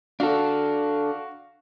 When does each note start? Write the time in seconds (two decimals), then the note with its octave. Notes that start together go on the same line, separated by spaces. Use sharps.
0.20 D4 F#4 A4 F5